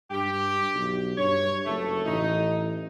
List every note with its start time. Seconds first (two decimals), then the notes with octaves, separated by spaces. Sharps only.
0.11 G2 G4
0.74 B1
1.18 G2 C#5
1.66 F#1 A3
2.06 A1 D#4